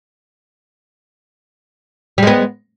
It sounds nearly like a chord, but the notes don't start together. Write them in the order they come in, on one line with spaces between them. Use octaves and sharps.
G3 G#3 B3